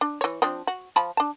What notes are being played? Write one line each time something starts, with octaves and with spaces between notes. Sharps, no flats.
D4
E3 C#5
F3 C4 D4
F#4
F3 A5 B5
D4 A5